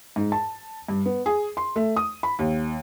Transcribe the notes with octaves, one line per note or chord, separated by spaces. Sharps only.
G#2
A5
G2
B3
G#4
C6
A3
D#6
B5
D#2